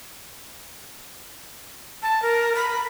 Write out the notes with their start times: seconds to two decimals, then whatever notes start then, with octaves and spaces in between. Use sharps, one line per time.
2.03 A5
2.22 A#4
2.56 B5